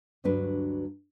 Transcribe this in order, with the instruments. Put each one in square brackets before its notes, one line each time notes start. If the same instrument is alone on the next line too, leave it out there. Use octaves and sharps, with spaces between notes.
[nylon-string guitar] D2 G2 F#3 D4 B4